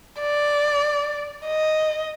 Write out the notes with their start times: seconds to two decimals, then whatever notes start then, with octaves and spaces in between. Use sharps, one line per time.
0.20 D5
1.45 D#5